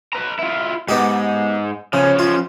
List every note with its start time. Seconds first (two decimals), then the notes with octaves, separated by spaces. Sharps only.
0.13 B4 A#5
0.39 E4 F4
0.89 G#2 B3 D#4 G4
1.93 C#3 F3 C#4
2.19 F4